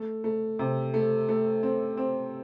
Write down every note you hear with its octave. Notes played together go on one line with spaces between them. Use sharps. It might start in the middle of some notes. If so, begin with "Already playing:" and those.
Already playing: A3
A3
C3
A3
A3
C4
C4